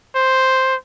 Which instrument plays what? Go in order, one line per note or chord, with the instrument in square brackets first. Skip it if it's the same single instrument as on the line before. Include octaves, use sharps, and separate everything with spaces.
[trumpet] C5